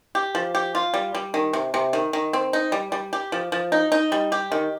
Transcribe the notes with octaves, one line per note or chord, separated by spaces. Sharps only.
G4
F3
G4
F4
G3
G3
D#3
C3
C3
D#3
D#3
C4
D#4
G3
G3
G4
F3
F3
D#4
D#4
G3
G4
D#3